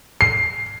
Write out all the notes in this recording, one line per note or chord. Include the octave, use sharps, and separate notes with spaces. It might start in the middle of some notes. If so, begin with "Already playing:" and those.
C7